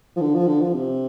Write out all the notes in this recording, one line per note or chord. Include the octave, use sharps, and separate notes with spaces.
F3
D3
F3
D3
F3
C3